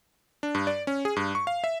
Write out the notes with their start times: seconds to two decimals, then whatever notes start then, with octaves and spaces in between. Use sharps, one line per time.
0.43 D4
0.55 G2
0.67 D5
0.87 C#4
1.05 G#4
1.16 G2
1.35 C#6
1.47 F5
1.64 E5